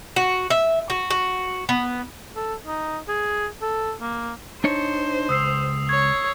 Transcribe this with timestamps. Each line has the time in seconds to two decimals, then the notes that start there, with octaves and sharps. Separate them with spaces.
0.16 F#4
0.50 E5
0.90 F#4
1.10 F#4
1.69 B3
2.36 A4
2.66 D#4
3.08 G#4
3.62 A4
4.01 A#3
4.64 D4 D#4 C5 C#5
5.29 C#2 D#6 E6 C7
5.89 C#5 G#6